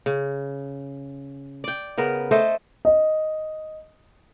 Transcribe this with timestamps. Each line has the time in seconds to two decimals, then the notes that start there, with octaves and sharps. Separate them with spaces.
0.06 C#3
1.64 D5 G5
1.97 C#3 B3 A#4
2.31 A3 A4 C5 D#5
2.85 D#5